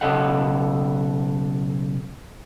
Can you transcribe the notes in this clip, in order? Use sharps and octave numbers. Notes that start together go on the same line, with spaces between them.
B1 C#3 A4 D#5 F#5